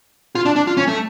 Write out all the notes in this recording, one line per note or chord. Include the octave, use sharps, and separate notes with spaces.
F4
D4
D4
F4
C#4
A3